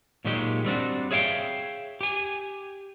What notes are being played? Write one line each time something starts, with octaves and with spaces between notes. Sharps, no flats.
A#2 D#3 F#3 G#3 G4
G3 C4 D4 F#4
G#4 C#5 E5 F5 G5
G4 G#5